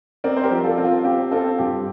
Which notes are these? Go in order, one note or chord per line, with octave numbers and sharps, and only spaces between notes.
C4 A#4 D5
C5
G4 A#4
F3
F4 A4
C4
F4
C4 G4
C4 F4 A4
G2 G4